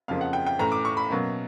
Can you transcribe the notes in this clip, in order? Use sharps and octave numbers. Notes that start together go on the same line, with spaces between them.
F2 C#3 F3 A#3 F5
F#5
G5
G5
A2 E3 A3 C#4 A#5
D6
C#6
B5
B2 F#3 A#3 C#4